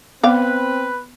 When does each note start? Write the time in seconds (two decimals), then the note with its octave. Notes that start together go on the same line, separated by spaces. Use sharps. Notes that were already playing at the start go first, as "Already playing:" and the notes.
0.24 B3 C4 B4 D5 F5